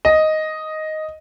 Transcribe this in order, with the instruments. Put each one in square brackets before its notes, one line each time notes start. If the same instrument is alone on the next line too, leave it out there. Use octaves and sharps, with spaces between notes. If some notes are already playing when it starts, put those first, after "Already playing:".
[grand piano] D#5